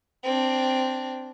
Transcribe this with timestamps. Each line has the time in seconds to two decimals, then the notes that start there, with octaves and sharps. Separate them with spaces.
0.23 C4 D4